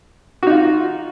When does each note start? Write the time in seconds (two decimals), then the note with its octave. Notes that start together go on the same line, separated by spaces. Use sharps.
0.43 F#4
0.47 D#4
0.51 F4